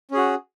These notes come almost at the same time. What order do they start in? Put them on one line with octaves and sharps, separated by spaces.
C#4 G#4 F#4